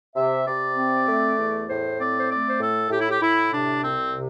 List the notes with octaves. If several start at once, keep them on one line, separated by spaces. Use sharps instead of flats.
C3 E5
C3 D5
C4
A3
E2
A2 C5
C4 D5
C5
A3 D5
C5
A2 A4
A2 G4
E4
G4
A2 E4
C3 D4
C2 C4
C3